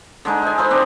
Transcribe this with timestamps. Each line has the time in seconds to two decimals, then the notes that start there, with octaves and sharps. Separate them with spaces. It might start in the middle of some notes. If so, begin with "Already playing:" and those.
0.25 D3 G#3 D#4
0.42 D#4 G#5
0.58 A4 C5 B5
0.71 C4 D4